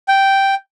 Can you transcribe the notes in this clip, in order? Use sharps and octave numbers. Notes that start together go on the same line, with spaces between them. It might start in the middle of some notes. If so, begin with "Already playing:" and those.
G5